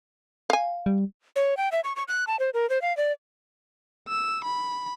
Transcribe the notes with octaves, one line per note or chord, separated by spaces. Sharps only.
F5 G#5
G3
C#5
G5
E5
C#6
C#6
F#6
A5
C5
A#4
C5
F5
D5
E6
B5